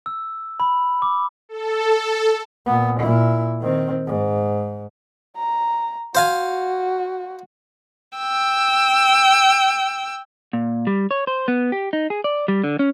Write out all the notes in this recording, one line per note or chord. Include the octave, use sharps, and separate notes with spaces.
E6
B5
D6
A4
A#2 B3
A#2 E4
D#3 C4
G#2
A#5
F#4 C5 F5 G#5
G5 E6
A#2
G3
C#5
C5
B3
G4
D#4
G#4
D5
G3
D3
C#4